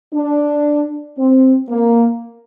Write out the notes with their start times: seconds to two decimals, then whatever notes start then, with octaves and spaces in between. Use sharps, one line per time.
0.14 D4
1.19 C4
1.70 A#3